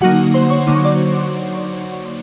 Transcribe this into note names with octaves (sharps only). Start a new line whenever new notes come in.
D3 F#3 A#3 D#4 F#4 F#5
C5 C6
C#5 C#6
D3 F#3 A#3 D#4 D6
C#6
D5 D6